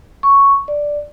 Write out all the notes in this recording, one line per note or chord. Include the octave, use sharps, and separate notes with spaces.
C#6
D5